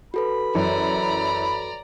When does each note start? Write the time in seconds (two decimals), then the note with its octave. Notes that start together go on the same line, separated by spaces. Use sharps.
0.14 F#4 A4 B4 B5
0.55 F#2 E3 D5 A#5